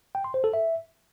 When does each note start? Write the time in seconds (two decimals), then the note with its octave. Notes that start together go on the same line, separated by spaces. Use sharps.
0.15 G5
0.24 C6
0.34 C5
0.44 A4
0.54 E5